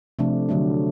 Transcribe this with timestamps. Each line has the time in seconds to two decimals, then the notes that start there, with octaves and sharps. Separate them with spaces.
0.19 C3 F3 A3 D4
0.49 D3 F#3 A3 D4